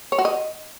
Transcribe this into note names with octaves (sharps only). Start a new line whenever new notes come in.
C#5
F#4
D#5